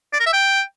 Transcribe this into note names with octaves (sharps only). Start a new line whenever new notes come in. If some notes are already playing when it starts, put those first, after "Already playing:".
D5
A#4
E5
G5